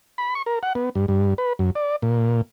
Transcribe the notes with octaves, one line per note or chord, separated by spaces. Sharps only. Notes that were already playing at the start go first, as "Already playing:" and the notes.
B5
C#6
A#4
F#5
B3
G2
G2
B4
F#2
D5
A#2